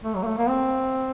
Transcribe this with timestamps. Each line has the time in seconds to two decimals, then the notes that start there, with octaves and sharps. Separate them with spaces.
0.04 A3
0.16 F#3
0.23 A#3
0.26 A3
0.38 A#3
0.49 C4